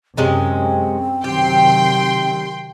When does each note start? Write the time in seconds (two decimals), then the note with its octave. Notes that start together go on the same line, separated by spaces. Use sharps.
0.17 F#2 C3 G#3 C4 C#4
1.24 C3 D#3 F#3 G4 G5 C6